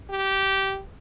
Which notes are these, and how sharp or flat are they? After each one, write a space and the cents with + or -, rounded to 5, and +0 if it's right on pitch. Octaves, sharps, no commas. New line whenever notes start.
G4 -15